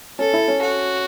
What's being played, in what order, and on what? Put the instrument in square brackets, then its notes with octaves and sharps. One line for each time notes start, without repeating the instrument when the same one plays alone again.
[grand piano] C#4 [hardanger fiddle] A4
[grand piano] E4
C#4
[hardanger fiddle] F#4